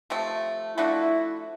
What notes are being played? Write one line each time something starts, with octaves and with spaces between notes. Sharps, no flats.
C3 F3 A3
F3 A3 D4 E4 F#4